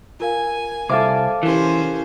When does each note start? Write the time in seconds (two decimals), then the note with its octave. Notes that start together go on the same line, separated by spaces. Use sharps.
0.20 F4 A#4 F5 G#5
0.89 C2 A4 C5 E5 F5 D6
1.43 E3 C#4 G4 A#4 C5